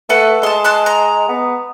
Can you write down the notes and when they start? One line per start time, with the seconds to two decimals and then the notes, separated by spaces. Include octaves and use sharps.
0.09 A3 A4 B4 F#5
0.43 G#3 A5 C6
0.64 A5 C6 F#6
0.86 A#5
1.29 B3